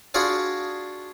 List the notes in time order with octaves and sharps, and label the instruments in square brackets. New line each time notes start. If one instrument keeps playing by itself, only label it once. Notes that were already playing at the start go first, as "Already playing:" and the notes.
[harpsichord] D4 F4 F#4 G#4 D5 G#5